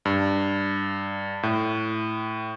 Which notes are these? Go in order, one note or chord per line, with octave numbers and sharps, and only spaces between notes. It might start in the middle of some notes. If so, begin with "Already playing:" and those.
G2
A2